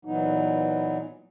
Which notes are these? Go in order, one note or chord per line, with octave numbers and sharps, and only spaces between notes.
A#2 E3 F#3 B3 D#4